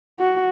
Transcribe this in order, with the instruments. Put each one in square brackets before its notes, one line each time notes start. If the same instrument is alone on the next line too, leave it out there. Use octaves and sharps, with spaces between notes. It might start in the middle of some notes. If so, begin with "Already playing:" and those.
[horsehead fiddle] F#4